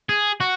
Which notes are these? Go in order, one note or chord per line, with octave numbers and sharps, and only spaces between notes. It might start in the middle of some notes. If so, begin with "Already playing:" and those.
G#4
F#4